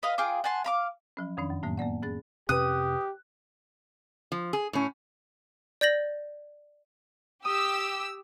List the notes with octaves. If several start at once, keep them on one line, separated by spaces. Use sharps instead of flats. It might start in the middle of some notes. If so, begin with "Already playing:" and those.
B4 D#5 F5
F4 G#4 G5 D6
F#5 G#5 A5 C6
F5 B5 D6
F3 F#3 C#4
F2 D#3 C#4 D4
F#2
A2 D#3 F#3 A#3 B3
A#3 B3 D5 F#5
C#4 G#4 A6
F2 C3 C#4 G4 B4 D#6 F#6
F3
G#4
A2 C#4
D5 G6 A6 A#6 F#7
G4 D#6 E6